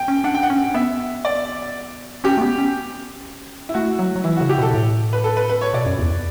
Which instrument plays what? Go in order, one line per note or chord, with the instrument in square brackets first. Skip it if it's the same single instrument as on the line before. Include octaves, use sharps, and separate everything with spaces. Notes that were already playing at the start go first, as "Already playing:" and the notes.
Already playing: [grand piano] G5
[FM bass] C#4
[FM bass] D4 [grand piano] F#5
[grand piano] G5
F#5
[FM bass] C#4
[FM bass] B3 [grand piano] E5
[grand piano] D5
[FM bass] C#4 [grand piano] G4
[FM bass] A3
B3
C#4
[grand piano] E4
[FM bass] A3 [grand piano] F#4
[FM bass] F#3
F#3
[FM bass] E3 [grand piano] E4
[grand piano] F#4
[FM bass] C#3
[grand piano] G4
[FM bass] B2 [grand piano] A4
[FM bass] A2
[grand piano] B4
A4
B4
B4
C#5
[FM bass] B2 [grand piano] D5
[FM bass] F#2
E2